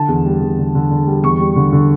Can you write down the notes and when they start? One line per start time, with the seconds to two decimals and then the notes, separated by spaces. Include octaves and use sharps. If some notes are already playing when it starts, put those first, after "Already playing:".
Already playing: D3 A5
0.09 E2
0.25 G3
0.41 E2
0.58 D3
0.75 D3
0.91 D3
1.07 G3
1.23 E2 C#6
1.40 G3
1.56 D3
1.73 D3